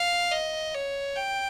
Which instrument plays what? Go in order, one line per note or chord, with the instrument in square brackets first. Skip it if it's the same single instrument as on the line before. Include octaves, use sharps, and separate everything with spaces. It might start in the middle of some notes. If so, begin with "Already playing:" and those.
Already playing: [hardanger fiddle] F5
D#5
C#5
G5